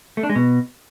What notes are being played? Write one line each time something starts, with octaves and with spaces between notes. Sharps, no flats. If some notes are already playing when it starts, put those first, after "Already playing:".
A3
D4
G#3
B2